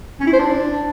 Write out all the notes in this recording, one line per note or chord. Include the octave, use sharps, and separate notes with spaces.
C#4
E4
C5
D4